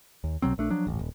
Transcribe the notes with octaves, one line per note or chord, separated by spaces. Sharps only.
D#2
C2 B2 F#3 C4
A#1 A3 D4
F3 F#3 D4
D#1 A1
D#1